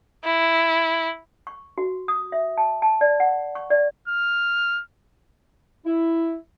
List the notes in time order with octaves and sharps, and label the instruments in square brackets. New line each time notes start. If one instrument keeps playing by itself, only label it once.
[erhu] E4
[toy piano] C#6
F#4
D#6
E5
A5
A5
D5
F#5
C#6
D5
[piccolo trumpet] F6
[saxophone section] E4